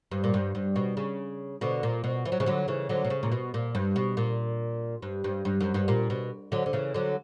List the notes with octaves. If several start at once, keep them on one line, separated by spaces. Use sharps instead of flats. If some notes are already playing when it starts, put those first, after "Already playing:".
G2
A#2
G2
G2
B2
C#3
B2 D3
A#2
B2
E3
F#3
C#3 E3
D3 F#3
C#3 E3
D3 F#3
B2
C#3
A#2
B2
A#2
G2
B2
A#2
G2
G2
G2
F#2
G2
A#2
B2
D3 F#3
D3
C#3 E3
D3 F#3